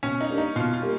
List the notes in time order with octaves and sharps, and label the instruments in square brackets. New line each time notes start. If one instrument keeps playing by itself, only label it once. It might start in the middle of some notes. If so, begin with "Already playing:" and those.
[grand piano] B2 [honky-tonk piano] C#4
[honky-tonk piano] D#4
[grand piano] G3 A#3 D4
[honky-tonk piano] D#4
[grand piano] B2 [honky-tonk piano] F4
[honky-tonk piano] F4
[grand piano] G3 A#3